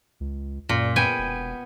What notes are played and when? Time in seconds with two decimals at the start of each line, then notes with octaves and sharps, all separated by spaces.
0.20 C#2
0.69 F#2 A#2
0.96 B3 G5 G#5
1.18 E1